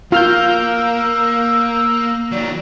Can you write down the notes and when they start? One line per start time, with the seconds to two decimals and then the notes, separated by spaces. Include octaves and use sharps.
0.12 A#3 F4 F5 E6 F6 G6
2.32 D#3 F#3 D5